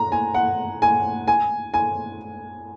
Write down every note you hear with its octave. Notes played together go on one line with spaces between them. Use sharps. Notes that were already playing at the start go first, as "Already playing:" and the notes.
Already playing: A#5
G#5
F#5
G#5
G#5
G#5